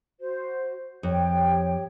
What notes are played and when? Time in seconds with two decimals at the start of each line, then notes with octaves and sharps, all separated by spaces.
0.20 F#4 C5
1.03 F2 G4 C#5 G5